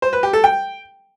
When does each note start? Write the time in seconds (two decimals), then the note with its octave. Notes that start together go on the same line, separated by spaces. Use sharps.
0.02 C5
0.13 B4
0.23 G4
0.33 A4
0.44 G5